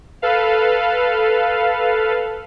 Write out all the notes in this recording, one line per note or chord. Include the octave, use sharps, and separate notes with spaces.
A4 B4 F5